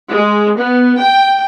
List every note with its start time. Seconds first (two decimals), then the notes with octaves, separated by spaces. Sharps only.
0.10 G#3
0.58 B3
0.99 G5